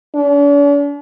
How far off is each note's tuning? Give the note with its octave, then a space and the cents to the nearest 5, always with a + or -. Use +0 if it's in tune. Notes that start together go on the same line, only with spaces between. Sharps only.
D4 -45